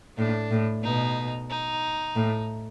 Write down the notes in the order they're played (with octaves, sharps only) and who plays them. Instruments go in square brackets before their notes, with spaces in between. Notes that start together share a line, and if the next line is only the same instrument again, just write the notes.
[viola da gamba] A2 [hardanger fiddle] D4
[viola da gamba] A2
[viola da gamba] B2 [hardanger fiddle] D#4
[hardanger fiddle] D#4
[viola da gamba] A2